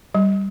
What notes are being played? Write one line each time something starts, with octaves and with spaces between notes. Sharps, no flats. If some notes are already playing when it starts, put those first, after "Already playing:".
G3